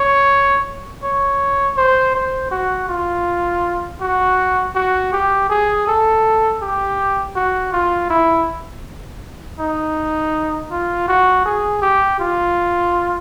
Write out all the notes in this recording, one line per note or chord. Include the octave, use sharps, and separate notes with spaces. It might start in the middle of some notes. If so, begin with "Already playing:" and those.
Already playing: C#5
C#5
C5
C5
F#4
F4
F#4
F#4
G4
G#4
A4
G4
F#4
F4
E4
D#4
F4
F#4
G#4
G4
F4